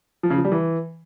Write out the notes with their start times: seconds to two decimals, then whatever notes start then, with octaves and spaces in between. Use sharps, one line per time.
0.23 F3
0.30 C#3
0.38 F3
0.45 G3
0.52 E3